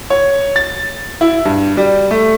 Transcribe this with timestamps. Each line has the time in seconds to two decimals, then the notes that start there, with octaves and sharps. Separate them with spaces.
0.10 C#5
0.56 A6
1.21 E4
1.45 G2
1.77 G3
2.11 A3